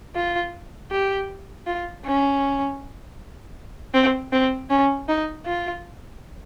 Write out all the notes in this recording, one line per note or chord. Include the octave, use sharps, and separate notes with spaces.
F4
G4
F4
C#4
C4
C4
C#4
D#4
F4